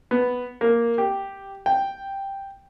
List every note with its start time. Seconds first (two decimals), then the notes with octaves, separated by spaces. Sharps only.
0.11 B3
0.61 A#3
0.98 G4
1.66 G5